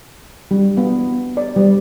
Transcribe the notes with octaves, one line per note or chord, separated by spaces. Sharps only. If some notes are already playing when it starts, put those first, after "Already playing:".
G3
B3
D5
G3